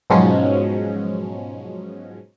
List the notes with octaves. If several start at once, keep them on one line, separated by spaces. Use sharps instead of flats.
G#2 B2 F3 F#3 G#3 C#4